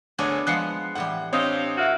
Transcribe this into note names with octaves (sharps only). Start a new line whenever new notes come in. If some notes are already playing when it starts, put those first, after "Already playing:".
D2 B3 D4 G#4 C#5
F3 G#3 B3 F#6 C7 C#7
A2 E3 G3 F#5
C4 D4 G4 C#5 D#5 F5
A#3 E4 F#4